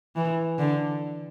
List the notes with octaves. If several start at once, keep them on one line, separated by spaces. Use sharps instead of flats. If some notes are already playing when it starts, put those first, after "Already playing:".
E3
D3